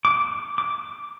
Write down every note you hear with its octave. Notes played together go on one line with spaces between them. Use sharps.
D6
D6